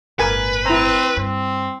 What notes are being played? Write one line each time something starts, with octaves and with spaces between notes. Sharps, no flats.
G1 A2 A#4 B4 G#5
C4 E4 A#5
G2 C4